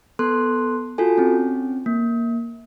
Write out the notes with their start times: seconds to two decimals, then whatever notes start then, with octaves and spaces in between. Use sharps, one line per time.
0.19 B3 A4 C6 F#6
0.98 F4 F#4 A4 G#5
1.18 C4 C#4
1.86 A#3